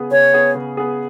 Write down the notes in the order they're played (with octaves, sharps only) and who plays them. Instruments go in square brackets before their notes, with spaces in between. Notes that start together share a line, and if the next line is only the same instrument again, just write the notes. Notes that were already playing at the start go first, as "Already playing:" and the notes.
Already playing: [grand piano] C#3 B3 G#4
[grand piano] C#3 [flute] C#5
[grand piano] B3 G#4
C#3
B3 G#4